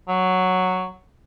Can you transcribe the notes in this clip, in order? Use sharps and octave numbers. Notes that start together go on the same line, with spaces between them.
F#3